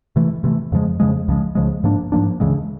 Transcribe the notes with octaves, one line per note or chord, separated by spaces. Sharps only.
C3 E3 A3
C3 E3 A3
F2 C#3 F3 G#3
F2 C#3 F3 G#3
C#2 C#3 F3 G#3
C#2 C#3 F3 G#3
G#2 F3 A#3 D4
G#2 F3 A#3 D4
D2 C#3 E3 G#3